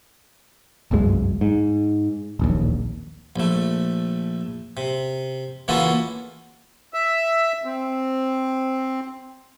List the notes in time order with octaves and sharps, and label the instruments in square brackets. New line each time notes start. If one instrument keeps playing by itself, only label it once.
[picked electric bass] G1 C2 F#2 G#3
G#2
D1 A#1 D#2
[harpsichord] A#1 A3
C3
C#3 E3 A#3 F4 F#4 A4
[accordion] E5
C4